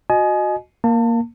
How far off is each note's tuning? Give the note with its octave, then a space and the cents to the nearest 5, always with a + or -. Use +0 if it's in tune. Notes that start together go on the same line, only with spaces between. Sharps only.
F#4 -20 D#5 -10 G#5 +30
A#3 +0 A5 +35